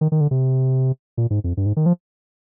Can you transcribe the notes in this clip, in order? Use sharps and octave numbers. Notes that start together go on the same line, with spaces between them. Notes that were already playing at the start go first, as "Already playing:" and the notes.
D#3
D#3
D3
C3
A#2
G#2
F2
G2
G#2
D#3
F3